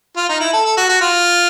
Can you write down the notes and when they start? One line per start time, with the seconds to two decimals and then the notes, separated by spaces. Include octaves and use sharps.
0.16 F4
0.29 D#4
0.40 E4
0.53 A4
0.65 A4
0.77 F#4
0.89 F#4
1.01 F4